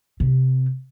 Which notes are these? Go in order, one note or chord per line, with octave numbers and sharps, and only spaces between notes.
C3